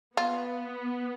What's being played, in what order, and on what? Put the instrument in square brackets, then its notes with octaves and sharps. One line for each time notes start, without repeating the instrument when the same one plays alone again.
[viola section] B3 [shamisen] F4